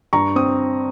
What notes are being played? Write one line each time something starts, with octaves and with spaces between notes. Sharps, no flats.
G2 A#5 C#6
C4 D#6